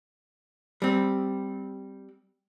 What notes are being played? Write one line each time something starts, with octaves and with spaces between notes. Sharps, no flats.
G3 C4